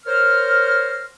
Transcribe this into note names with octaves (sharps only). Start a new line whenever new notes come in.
A#4 C5 C#5 F6